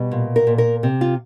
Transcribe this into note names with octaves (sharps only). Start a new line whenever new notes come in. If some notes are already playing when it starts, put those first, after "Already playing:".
Already playing: B2 G3
A#2
A#4
A#2
A#4
C3
F4